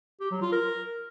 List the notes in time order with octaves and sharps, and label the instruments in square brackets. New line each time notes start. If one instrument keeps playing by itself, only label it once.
[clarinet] G4
F#3
F4
A#4